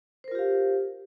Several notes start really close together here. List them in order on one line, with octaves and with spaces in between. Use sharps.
C5 A#4 F4 G4 F5